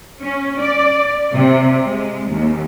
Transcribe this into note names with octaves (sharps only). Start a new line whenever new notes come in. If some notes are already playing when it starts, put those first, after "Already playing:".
C#4
D5
C3
G#3
D#2